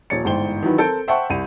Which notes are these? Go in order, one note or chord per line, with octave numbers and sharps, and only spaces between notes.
D#1 F3 C#5 A6 C#7
G1 G#2 E3 C5 G5 G7
D#3 E3 F#3 B4
C4 A4 A#4 G6 D7
C5 E5 F#5 G5 A5 C#6
C2 D#7